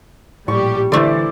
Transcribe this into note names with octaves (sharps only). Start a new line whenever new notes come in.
A#1 A2 G3 G4 C#6
D3 E3 A3 D4 E4 C5 D5